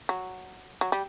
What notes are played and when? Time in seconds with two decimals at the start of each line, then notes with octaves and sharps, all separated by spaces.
0.09 F#3
0.81 F#3
0.92 G3